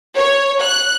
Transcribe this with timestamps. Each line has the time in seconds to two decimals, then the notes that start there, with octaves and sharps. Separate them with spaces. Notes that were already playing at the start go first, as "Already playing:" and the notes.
0.16 C#5
0.62 F#6